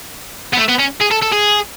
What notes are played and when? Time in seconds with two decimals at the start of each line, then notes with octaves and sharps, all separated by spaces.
0.53 B3
0.58 A3
0.68 B3
0.79 C#4
1.00 G#4
1.11 A4
1.22 A4
1.32 G#4